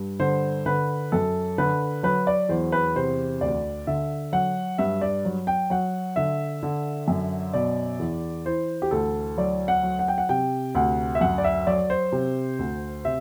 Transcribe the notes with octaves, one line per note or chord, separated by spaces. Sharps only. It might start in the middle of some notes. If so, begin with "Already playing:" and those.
Already playing: G2
D3 C5
D3 B4
F#2 A4
D3 B4
F#3 B4
D5
E2 C5
B4
C3 C5
D2 D5
D3 E5
F#3 F#5
G2 E5
D5
F#3
G5
F#3 F#5
D3 E5
D3
F#2
B2 D5
E2
E3 C5
G4
D2 A4
F#3 D5
F#5
F#3
F#5
G5
F#5
C3 G5
D2 F#5
E5
F#2 F#5
D5
E5
F#3 D5
C5
C3
D2
C3 E5